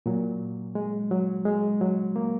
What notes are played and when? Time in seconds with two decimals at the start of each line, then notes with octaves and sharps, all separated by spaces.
0.06 A#2 F#3
0.75 G#3
1.11 F#3
1.45 G#3
1.81 F#3
2.16 A#3